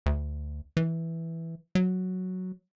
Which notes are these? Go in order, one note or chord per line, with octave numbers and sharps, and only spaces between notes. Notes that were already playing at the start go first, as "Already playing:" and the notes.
D2
E3
F#3